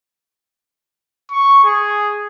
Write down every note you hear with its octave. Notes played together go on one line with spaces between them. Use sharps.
C#6
G#4